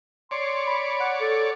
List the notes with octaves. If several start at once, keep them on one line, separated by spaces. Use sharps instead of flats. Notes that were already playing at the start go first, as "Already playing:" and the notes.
C#5 D5 C6
B5
F#5
A4